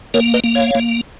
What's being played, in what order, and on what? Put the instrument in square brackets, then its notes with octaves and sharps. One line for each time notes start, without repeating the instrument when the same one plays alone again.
[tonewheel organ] A#3 A#4 C#5
B4 D#5
A#3
C#5 F5
A#3